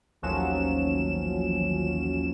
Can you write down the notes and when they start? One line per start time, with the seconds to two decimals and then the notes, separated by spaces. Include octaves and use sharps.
0.22 A1 D#2 F3 F#3 C#4 E7